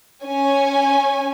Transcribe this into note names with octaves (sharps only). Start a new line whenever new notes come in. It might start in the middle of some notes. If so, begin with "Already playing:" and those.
C#4 G#5